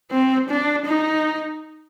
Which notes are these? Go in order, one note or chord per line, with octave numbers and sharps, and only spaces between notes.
C4
D4
D#4